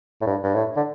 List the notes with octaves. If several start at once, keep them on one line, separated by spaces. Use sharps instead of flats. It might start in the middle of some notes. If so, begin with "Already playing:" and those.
A2
G2
G2
A2
D3